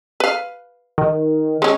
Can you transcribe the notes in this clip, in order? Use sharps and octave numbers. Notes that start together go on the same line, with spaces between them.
B4 F5
D#3
G#3 C#4